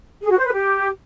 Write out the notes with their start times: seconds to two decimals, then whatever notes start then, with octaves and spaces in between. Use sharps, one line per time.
0.23 G#4
0.30 F#4
0.38 C5
0.45 B4
0.52 G4